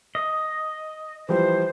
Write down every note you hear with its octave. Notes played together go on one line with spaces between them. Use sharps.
D#5
E3 F3 G3 C5